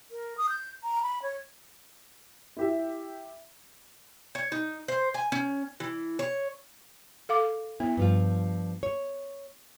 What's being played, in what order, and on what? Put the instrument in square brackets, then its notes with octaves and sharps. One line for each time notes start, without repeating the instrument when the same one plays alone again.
[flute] A#4
D#6
G6
A#5
B5
C#5
[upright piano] E4 G4 E5
[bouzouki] C#5
D#4
C5
G#5
C#4
E3
C#5
[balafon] A4 F5 D6
[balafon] B3 [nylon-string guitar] E4
[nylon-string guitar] G2 F3 F4
C#5